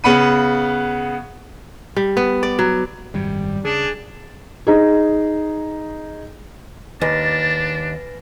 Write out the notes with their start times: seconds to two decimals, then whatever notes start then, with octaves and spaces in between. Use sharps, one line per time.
0.04 C#3 B3 F#5 B5 D#7
1.96 G3
2.17 B3
2.43 D5
2.59 F#3
3.14 G#1 F#2 C3 G3
3.65 C#3 D4 G#4
4.67 D#4 G#4
7.01 D#2 D4 B4 G#5 A6 A#6